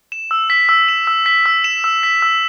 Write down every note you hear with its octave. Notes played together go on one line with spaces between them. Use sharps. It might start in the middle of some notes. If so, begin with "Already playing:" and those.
E7
E6
B6
E6
E7
E6
B6
E6
E7
E6
B6
E6